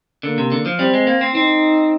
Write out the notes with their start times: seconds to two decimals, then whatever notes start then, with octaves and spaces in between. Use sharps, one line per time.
0.23 D3 A#3
0.38 C3
0.52 D3
0.66 F3
0.79 G3 C4
0.94 G#3
1.07 A#3
1.21 C4
1.35 C4 D#4